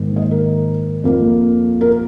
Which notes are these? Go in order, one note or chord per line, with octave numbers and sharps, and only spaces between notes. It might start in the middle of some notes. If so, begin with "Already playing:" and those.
Already playing: G#2 D#3 A#3
D#5
A#4
F2 F3 A#3
A#4